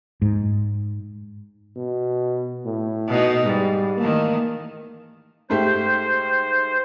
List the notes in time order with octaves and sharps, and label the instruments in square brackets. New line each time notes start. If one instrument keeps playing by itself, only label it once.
[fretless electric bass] G#2
[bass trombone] B2
A2
[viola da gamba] B2 D#4
[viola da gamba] G#2 [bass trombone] G3
[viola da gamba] D#3 E3 A3 [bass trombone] A#3
[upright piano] G#2 A3 G4 [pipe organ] C5